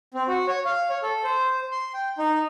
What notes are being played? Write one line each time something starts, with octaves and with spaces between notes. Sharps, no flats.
C4
F#4
C#5
F5
C#5
A4
C5
C6
G5
D#4